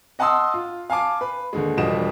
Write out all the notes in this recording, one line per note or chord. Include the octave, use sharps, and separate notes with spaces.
D#5 F#5 A5 C6 D#6 E6
F4
F5 G#5 A5 D6
B4
D#2 D3 G#3
E1 F3 G3 D#5 E7